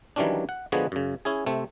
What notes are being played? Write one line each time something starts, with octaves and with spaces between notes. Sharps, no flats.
D#3 E3 F#3 G3 C#4 D4
F#5
D3 F3 G#3 B3 F#4 G#4
F#2 C#3
C#4 E4 G#4
C3 A3 C4